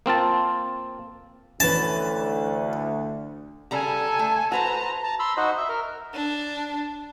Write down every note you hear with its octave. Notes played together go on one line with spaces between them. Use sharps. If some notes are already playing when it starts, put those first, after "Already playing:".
A#3 C4 F4 A5
D2 E3 C#4 B4 A5
C#3 G3 A4 G#5 A#5
A3
F#4 B4 C5 A5 A#5
A5 A#5
B5 C6 E6
D#4 F#4 C5 D#5
E5
A#4
D4